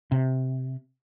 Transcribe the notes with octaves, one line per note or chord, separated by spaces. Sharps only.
C3